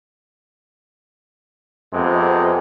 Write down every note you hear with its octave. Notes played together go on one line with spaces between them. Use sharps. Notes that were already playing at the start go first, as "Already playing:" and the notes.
F2 C3 G#3 B3